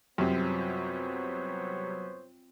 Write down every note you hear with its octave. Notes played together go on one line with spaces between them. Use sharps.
F#2 C3 G3 B3 C4 F4 C5 C#5